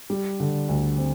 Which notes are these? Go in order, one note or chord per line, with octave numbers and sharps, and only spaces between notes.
G3
D3
D2
C4